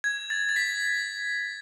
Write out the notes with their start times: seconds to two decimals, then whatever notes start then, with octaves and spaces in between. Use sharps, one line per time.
0.04 G#6
0.30 A6
0.49 A6
0.56 B6